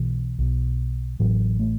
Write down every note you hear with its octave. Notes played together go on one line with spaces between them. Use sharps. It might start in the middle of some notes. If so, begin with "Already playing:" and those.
Already playing: B1 B2 E3
B1 B2
A1 A2 F#3
A3